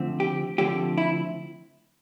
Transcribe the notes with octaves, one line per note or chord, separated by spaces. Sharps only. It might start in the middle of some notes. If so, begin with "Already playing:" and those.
Already playing: D3 F3 A3 C4
G4
D3 F3 A3 C4 G4
E4